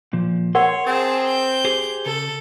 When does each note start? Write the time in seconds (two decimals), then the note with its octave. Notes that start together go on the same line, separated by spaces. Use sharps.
0.13 A#2 F3
0.55 A#4 C#5 F#5 C6
0.86 C4 G#4 A5
1.27 G6
1.65 G4 G#4 C5
2.06 C#3 A4